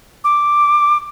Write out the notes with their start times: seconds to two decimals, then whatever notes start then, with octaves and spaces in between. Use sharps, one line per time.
0.24 D6